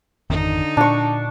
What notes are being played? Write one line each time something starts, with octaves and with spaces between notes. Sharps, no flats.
G#1 F2 D3 D#3 D#4
A#2 D4 C#6